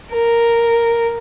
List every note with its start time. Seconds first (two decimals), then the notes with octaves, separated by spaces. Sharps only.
0.13 A#4